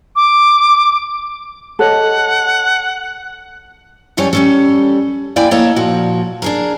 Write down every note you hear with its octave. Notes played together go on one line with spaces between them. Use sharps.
D6
A4 C#5 D#5 F#5
F#2 F#3 G3 A4 C#5 G#5
G3 C#4 A4
A#3 E4 D5 G5 G#5
A#3 A4 C#5 D#5 A5
A#2 F3 F#4
D4 G#4 A#4